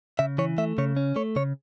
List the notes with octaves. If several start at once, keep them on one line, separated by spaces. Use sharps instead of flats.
C#3 E5
E3 C#5
A3 E5
C#3 C#5
C#4
A3 C#5
C#3 C#5